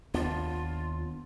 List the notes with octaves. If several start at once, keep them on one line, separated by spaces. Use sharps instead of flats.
D#2 B3 D4 F4